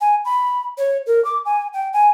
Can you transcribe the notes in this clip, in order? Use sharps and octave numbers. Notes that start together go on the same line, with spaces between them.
G#5
B5
C#5
A#4
D6
G#5
G5
G#5